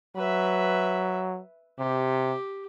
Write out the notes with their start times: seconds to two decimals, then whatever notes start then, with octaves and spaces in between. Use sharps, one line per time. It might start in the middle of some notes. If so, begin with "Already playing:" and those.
0.16 F#3 B4 E5
1.79 C3 G4